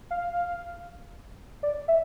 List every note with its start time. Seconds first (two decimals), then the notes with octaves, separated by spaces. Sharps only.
0.11 F5
1.63 D5
1.88 E5